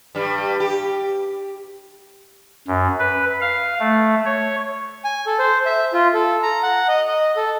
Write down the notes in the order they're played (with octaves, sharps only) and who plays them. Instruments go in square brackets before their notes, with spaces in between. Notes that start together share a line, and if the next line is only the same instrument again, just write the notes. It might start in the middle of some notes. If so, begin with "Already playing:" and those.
[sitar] G2 G3
G4
[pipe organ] F#2
B4
F5
A3
C#5
[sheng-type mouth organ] G#5
A4
C5
E5
F4
A4
A#5
F#5
D#5
D#5
A4